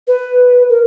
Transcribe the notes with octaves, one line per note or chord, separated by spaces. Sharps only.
B4
A#4